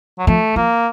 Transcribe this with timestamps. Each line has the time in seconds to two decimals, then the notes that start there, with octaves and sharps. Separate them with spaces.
0.19 F#3
0.27 F3 A3
0.56 F3 A#3